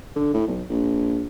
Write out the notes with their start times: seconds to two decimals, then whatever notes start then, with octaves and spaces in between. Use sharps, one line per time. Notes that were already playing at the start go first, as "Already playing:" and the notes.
0.16 D3
0.34 A2
0.47 B1
0.70 A#1